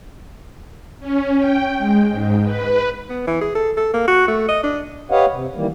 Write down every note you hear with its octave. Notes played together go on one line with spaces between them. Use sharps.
C#4
G5
G#3
G#2
B4
B3
E3
G#4
A4
A4
A#3
F#4
A3
D#5
D4
G4 B4 C#5 D#5 F5 F#5
C3
D#3 E3 G3 A#3